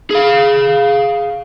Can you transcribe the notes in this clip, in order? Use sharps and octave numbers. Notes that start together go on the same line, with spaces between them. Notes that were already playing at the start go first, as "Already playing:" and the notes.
G#4 F5